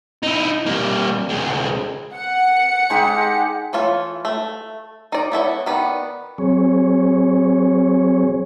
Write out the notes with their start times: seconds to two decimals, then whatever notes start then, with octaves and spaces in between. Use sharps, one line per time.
0.23 D#4 E4
0.66 G3 A#3
1.29 D2 G#3
2.14 F#5 C#7
2.90 G#3 D#4 G4
3.73 E3 A3 F4 C#5
4.25 A3
5.12 D#4 D5
5.32 B3 E4 A4 C#5
5.66 D#3 B3 D5 B5
6.38 F#3 C4 G#4 C#5